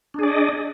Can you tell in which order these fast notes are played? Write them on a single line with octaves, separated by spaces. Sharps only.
D4 G#4 D5 D#5